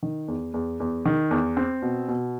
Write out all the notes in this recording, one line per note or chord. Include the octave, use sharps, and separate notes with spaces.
D#3
E2
E2
E2
D#3
E2
C4
B2
B2